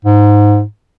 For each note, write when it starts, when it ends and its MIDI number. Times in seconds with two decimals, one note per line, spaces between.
0.05 0.63 44